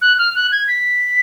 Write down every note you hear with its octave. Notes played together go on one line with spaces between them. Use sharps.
F#6
F6
F#6
G#6
B6